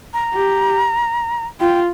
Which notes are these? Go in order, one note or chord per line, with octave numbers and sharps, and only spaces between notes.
A#5
G4
F4 G5